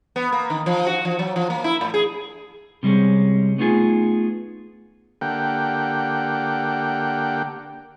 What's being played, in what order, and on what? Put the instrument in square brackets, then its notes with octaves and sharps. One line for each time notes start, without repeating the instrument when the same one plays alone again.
[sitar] B3
A#3
D#3
F3
F#4
F3
F#3
F3
A#3
E4
A2
G#4
[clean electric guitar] C3 G3 G#3 C#4
A3 B3 D#4 F4 G#4
[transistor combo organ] D3 A#3 G4 F#5 G5